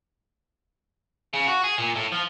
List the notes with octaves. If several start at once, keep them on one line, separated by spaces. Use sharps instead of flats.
C#3
F#4
G#4
A#2
A2
F3